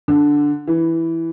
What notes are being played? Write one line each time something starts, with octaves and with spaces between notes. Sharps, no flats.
D3
E3